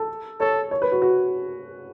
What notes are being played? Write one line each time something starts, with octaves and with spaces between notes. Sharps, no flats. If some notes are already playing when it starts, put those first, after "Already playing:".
Already playing: A4
A4 C#5
C#5
B4
F#4
F#4